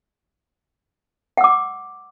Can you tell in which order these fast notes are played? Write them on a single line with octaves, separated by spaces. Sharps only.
F#5 E6 D6